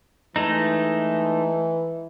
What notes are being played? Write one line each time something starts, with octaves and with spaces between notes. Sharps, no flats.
E3 G#3 A3 D#4